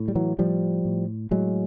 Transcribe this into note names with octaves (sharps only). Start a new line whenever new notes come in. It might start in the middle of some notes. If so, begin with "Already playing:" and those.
Already playing: A2
G3
E3 F#3
A2 F3 G3
A2
A2 F#3 G#3